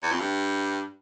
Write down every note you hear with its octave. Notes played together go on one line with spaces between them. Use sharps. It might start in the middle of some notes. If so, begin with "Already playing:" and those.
E2
F2
G2